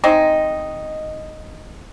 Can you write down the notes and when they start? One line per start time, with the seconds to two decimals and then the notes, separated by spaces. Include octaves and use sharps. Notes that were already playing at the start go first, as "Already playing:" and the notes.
0.04 G#3 C4 D#4